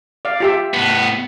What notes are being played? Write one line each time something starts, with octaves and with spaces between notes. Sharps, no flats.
D5 F5
F4 G4 E5
A2 B3